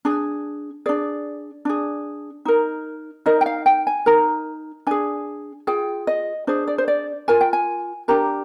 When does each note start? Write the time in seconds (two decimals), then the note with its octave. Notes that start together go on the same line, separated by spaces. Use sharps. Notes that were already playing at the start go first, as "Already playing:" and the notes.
0.05 D4 G#4
0.86 D4 G#4 D5
1.65 D4 G#4
2.45 D#4 A#4
3.26 D#4 A#4 D#5
3.41 G5
3.46 F5
3.66 G5
3.87 G#5
4.06 D#4 A#4 A#5
4.87 D4 G#4 G#5
5.67 F4 G#4 G5
6.07 D#5
6.47 D4 G#4 C5
6.68 D5
6.78 C5
6.88 D5
7.28 F4 A#4 G#5
7.41 G5
7.53 G#5
8.08 D4 G4 A#4 A#5